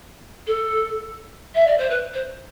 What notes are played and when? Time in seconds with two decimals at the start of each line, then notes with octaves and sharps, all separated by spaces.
0.47 A4
1.55 E5
1.67 D5
1.77 C5
1.90 B4
2.13 C5